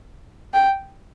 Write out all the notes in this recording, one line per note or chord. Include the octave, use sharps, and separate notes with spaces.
G5